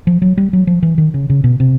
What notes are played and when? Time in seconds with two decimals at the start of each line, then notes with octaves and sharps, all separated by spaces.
0.07 F3
0.22 F#3
0.37 G3
0.53 F#3
0.67 F3
0.82 E3
0.98 D#3
1.14 C#3
1.29 C#3
1.44 B2
1.60 C3